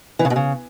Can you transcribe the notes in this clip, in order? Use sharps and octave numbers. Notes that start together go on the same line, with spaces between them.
E3
C#3
B2
C#3